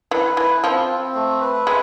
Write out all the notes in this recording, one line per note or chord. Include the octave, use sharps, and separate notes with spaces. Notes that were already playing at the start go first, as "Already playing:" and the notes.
E3 B4
E3 E4
F3 C4
C4
A3
B4
G#3 E5